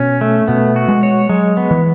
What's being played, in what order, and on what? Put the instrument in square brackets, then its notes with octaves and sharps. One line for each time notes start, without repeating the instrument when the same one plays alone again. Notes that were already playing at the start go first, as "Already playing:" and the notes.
Already playing: [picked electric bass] B2 [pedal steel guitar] C#4
[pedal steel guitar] A3
[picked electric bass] B2 [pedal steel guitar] B3
[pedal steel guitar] F#4
[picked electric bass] G#3
[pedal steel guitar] C#5
[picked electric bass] F#3 [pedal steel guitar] G#3
[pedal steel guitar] B3
[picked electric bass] E3